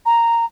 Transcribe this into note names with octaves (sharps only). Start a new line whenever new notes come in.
A#5